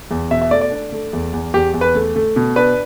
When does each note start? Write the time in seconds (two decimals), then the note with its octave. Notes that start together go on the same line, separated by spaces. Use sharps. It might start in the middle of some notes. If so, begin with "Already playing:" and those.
0.11 E2
0.31 B2 E5
0.41 E5
0.51 A3 D5
0.61 D5
0.71 D4
0.92 A3
1.13 E2
1.33 E2
1.54 E2 G4
1.74 E2
1.81 B4
1.95 A3
2.16 A3
2.36 B2
2.56 D4 B4